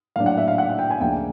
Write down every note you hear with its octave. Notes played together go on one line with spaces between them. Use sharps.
A2 F#3 A#3 D4 F5
F#5
E5
F5
F#5
F#5
G5
G#5
D2 C#3 F3 A#3 D4 G5